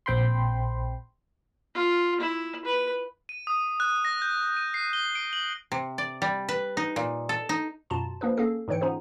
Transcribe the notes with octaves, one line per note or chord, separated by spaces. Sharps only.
A#1 C4 G5 B5 C6
F4
E4
B4
D#7
D#6
F#6
A#6
G6
D#7
C7
G7
D7
F#7
C3
D5
G3
B4
D#4
A#2
A4
D#4
F#2 B2 F4 A5 A#5 C6
F3 A#3 D4 G#4 B4
A#3 C#4 G#4 A4 C7
G#2 D3 E3 C#5 G5 C#7
B3 C#4 D#4 F4 G#4 C5